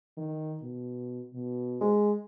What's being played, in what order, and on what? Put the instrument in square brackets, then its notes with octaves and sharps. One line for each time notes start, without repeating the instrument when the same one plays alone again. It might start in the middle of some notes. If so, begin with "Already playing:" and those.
[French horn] D#3
B2
B2
[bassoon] G#3